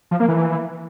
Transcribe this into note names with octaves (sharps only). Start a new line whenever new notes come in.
F3
A#3
E3